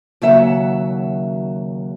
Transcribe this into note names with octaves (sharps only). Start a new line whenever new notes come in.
D#2 C#3 F#3 E5 F#5